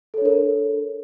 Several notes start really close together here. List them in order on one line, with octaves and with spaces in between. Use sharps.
A4 C#5 D4 A#4